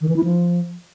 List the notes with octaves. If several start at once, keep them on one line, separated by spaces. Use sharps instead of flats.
D#3
E3
E4
F3